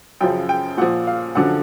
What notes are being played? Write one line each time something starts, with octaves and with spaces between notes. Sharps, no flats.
F#2 C#3 F3 G5
G5
A#2 F3 F#5
F5
F#2 D3 F3 F#5